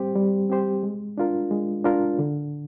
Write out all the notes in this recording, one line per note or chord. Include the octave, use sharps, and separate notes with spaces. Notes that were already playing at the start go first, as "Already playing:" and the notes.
Already playing: G3 C4 G4 C5
G3
C4 G4 C5
G#3
D4 F4 A#4
G#3
D4 F4 A#4
D3